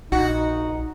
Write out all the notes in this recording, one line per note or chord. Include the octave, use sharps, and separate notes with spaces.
A#1 D#4 F#4